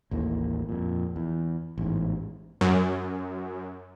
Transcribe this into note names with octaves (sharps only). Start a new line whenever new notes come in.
A1 D#2 A2 A#3
F2 A#2
E2
A1 E2 G#2
F#2